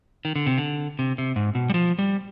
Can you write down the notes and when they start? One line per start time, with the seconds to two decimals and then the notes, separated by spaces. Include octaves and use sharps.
0.25 D#3
0.36 D3
0.46 C3
0.58 D3
0.99 C3
1.18 C3
1.36 G#2
1.55 B2
1.70 G3
1.74 F3
1.99 G3